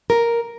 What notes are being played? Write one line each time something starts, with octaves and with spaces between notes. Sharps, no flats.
A#4